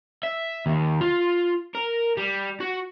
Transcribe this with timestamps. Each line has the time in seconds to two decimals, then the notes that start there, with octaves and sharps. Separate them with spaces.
0.24 E5
0.66 D#2
1.01 F4
1.75 A#4
2.17 G3
2.60 F#4